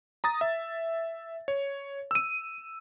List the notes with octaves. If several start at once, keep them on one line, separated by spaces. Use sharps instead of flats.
A#5 D#6 A6
E5
C#5
E6 D#7